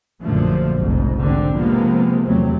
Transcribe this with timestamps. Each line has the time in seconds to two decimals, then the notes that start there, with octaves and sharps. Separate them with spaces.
0.22 A#1 F#2 A#2 D3 F3 A3
0.77 F1 B1 G#2
1.19 D3 C4
1.55 C3 F3 G#3 A#3 B3
2.24 F1 E2 C3 F#3 A3 C4